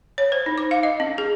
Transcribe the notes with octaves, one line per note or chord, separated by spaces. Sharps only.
C#5
C5
D#4
D6
F5
D#5
C#4
G#4